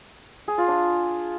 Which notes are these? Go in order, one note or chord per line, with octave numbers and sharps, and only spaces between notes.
G#4
F4
D4